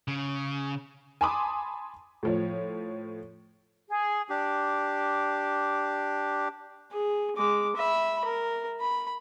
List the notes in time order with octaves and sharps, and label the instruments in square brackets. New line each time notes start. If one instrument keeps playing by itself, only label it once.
[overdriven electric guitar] C#3
[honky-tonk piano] G#5 A5 B5 C6 D6 D#6
A2 F3 C#5
[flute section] G#4
[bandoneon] D4 G4
[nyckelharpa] G#4
G#3 D6
E5 B5
A#4
B5